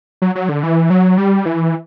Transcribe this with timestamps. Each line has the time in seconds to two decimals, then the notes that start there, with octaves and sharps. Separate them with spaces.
0.22 F#3
0.35 F#3
0.49 D3
0.63 E3
0.90 F#3
1.18 G3
1.46 E3